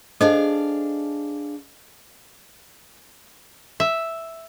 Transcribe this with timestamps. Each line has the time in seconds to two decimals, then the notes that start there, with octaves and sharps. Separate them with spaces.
0.21 D4 G#4 A4 C5 D#5 F5
3.80 E5